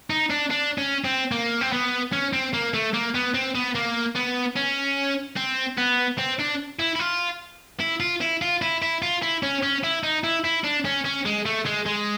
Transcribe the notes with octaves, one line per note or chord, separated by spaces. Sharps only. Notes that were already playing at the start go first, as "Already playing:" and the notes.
D#4
D4
D4
C#4
C4
A#3
C4
B3
C#4
C4
A#3
A3
A#3
B3
C4
B3
A#3
B3
C#4
C4
B3
C4
D4
E4
E4
F4
E4
F4
E4
F4
E4
E4
F4
E4
C#4
C#4
E4
D#4
E4
E4
D4
C#4
C#4
G#3
A3
G#3
G#3